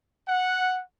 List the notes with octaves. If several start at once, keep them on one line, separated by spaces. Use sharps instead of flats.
F#5